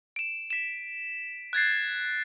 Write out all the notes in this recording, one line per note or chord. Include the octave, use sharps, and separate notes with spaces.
D7 E7
B6 E7
F#6 G#6 A6 C7